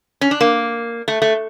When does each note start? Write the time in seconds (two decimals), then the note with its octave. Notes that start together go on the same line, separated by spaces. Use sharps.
0.21 C#4
0.31 D4
0.41 A#3
1.08 A3
1.22 A3